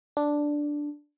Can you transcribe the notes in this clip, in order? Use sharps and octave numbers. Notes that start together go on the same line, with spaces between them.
D4